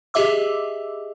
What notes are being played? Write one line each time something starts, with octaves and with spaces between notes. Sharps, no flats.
G4 G#4 D#5 E5 D6 E6